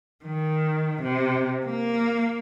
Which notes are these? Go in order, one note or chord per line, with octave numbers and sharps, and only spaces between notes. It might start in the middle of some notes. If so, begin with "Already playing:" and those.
D#3
C3
A#3